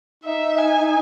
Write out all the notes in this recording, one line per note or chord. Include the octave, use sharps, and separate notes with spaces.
D#4 E5
G#5